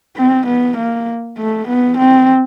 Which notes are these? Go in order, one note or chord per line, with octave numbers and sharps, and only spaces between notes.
C4
B3
A#3
A3
B3
C4